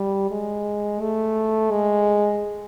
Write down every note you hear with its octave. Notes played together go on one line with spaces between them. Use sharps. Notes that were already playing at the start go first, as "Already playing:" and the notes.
Already playing: G3
G#3
A3
G#3